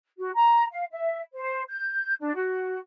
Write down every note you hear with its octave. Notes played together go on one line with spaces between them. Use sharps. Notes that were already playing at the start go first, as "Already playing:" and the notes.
F#4
A#5
F5
E5
C5
G6
D4
F#4